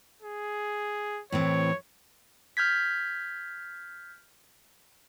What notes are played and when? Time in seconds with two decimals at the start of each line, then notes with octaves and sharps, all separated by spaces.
0.22 G#4
1.32 A2 E3 C4 C#5
2.57 F6 G6 G#6 B6